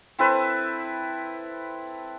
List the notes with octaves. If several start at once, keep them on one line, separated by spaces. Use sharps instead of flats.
C4 E4 A4 B4